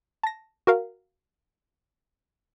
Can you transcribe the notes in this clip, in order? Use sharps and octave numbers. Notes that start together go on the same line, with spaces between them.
A5 A#6
F#4 A#4 F5